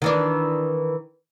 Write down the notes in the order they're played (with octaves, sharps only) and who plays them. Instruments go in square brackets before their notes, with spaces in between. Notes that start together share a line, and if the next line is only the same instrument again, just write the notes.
[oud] D#3 E3 D4